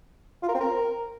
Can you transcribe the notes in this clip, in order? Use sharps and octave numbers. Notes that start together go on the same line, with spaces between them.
F4
A#4
C4
A#4